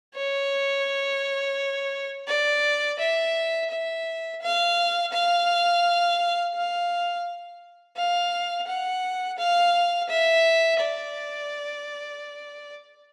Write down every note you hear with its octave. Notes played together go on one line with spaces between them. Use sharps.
C#5
D5
E5
E5
F5
F5
F5
F5
F#5
F5
E5
D5